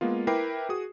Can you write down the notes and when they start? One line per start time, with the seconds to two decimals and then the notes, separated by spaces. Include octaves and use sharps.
0.01 G#3 A#3 B3 F4
0.27 E4 A#4 B4 G5 D6 C7
0.69 F#4 G#4 D#6